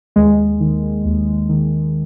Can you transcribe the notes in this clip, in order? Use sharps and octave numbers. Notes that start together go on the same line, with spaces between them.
D#2 G#3
D#3
D#2
D#3